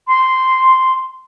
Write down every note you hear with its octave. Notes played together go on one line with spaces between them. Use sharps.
C6